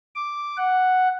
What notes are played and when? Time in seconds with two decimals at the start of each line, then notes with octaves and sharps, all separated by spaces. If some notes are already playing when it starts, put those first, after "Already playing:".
0.16 D6
0.57 F#5